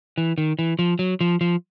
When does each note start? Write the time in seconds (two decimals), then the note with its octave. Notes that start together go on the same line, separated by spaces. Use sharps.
0.18 E3
0.38 D#3
0.59 E3
0.79 F3
0.99 F#3
1.21 F3
1.41 F3